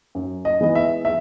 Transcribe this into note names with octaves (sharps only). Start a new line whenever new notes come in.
F#2
D#5
E3 G#3 B3 D#5
E5
E5